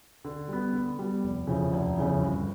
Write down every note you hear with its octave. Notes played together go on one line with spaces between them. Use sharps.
D3
G3 B3
D3
G3 B3
F1
F2 C#3 E3
F1
F2 C#3 E3
G1